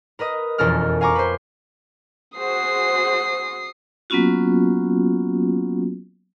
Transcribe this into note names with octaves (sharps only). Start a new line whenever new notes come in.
A#4 B4 D#5 D#6
E1 F2 C#4 A4 A#4 F6
F5 G#5 A#5 C#6 D6
B4 C5
F#4 G#4 C5 D#6 C7
F#3 A#3 B3 C#4 F4 F#4